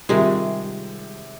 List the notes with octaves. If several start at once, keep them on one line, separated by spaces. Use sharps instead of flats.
C3 D#3 G3 G#3 F4 A#4 E5